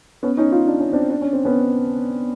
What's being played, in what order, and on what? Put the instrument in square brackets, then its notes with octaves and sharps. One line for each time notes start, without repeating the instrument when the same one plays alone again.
[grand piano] B3 C#4
C#4 D#4
D#4 F4
D4
C#4
C4 D4
D4
C#4
C4
B3 C#4